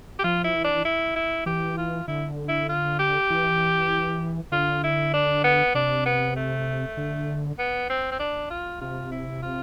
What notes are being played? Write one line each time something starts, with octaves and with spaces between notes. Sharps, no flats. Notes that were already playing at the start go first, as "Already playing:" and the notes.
G4
F3 F4
E4
E3
D4
E4
E4
E3 G4
F4
D3 E4
E4
F4
G4
E3
D3 F4
E4
D4
B3
C3 D4
B3
A3
D3
B3
C4
C4
D4
F4
C3 F4
E4
F4